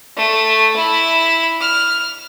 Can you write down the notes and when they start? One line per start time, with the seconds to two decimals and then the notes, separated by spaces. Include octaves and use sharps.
0.16 A3
0.76 E4
1.60 F6